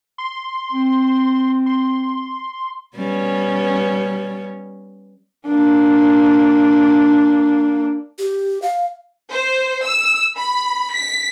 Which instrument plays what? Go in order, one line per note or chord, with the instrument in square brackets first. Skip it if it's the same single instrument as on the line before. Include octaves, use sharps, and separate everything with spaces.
[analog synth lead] C6
[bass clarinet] C4
[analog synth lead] C6
[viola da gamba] G3 B3 C#4
[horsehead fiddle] A#3 D4
[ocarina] G4
F5
[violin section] C5
E6
B5
B6